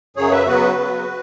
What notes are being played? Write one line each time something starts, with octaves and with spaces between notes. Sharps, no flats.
F#2 C#3 F#3 G#4 C#5
B4 E5
C#3 F#3 B3 F#4 B4
C#3 F#3 B3